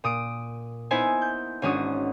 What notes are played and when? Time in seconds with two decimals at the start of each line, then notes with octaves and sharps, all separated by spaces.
0.04 A#2 D#6 D7
0.91 B3 D#4 E4 C5 E5 G#5
1.22 G6
1.62 G#1 G#3 C#4 D4 F#4 D#6